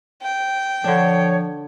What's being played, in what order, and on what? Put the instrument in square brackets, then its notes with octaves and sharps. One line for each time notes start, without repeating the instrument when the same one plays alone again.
[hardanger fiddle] G5
[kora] D3 D4 [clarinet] F3 [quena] C#5